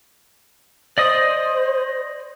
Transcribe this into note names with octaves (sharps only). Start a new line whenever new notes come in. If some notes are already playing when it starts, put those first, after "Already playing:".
C5 D5 D#5 D#6